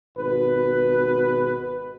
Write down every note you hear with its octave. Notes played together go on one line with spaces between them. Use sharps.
G#1 B2 B4